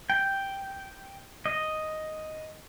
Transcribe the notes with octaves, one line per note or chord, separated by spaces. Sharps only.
G5
D#5